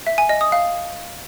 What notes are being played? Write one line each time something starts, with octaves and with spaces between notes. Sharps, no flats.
E5
G#5
D#5
D#6
F5